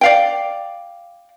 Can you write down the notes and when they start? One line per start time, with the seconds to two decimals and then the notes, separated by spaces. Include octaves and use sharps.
0.01 D5 F5 G5